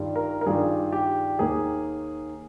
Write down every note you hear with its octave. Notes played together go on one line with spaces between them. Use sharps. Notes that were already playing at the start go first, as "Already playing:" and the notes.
Already playing: G2 D#3 G3 D4 F4
A#4
A#4
G2 D#3 G3 D4 F4 G#4
G4
D#2 D#3 A#3 G#4